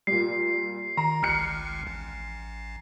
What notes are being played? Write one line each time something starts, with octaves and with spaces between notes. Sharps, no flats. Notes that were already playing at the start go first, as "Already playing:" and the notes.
A#2 G3 C7
D#3 A#5
G#1 C#2 F6 F#6 C#7
A1